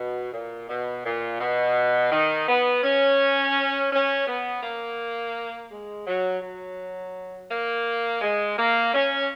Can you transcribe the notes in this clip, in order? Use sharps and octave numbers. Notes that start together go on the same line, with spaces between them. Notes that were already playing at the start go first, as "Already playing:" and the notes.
Already playing: B2
A#2
B2
A#2
B2
D#3
B3
C#4
C#4
B3
A#3
G#3
F#3
F#3
A#3
G#3
A#3
C#4